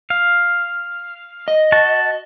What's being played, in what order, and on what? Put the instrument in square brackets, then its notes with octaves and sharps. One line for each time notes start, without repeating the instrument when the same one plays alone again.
[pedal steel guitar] F5
[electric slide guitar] D#5
[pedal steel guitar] F#4 A5